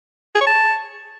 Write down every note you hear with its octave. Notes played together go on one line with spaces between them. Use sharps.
G#4
C#5
A5